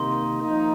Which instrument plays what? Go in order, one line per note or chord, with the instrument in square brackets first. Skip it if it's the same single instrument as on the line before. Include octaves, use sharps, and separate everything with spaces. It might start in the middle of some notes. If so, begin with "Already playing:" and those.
Already playing: [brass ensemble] C3 D#3 A#3 D#4 [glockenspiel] C6
[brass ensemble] F3 A#3 D#4